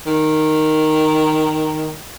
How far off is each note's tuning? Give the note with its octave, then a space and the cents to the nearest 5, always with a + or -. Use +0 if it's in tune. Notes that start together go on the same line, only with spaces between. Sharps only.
D#3 -5